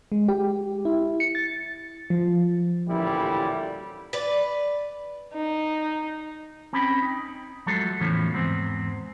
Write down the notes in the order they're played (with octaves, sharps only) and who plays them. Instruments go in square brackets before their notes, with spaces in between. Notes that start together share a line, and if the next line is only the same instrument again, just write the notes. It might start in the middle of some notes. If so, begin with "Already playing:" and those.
[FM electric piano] G#3
G4
E4
C#7
A6
F3
[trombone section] A1 D2 A#2 G3 E4
[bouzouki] B4 D5
[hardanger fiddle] D#4
[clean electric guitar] C4 C#4 G5 B5
D#4
F3 F#3 G#3 A3 A4
E2 A2 C#3 E3 F3
E2 G#2 C4